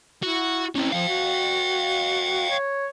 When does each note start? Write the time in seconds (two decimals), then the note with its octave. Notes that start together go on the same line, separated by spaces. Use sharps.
0.23 E4 F#4
0.76 C4 C#4 E4
0.93 F3 F5 G5
1.08 F#4
2.49 C#5